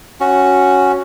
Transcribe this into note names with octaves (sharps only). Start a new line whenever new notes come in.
C#4 F#4